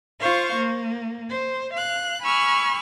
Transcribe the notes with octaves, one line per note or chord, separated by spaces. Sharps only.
F4 C5 F5 C#6
A#3
C5
F5 F#6
G#5 B5 C#6 E6 F6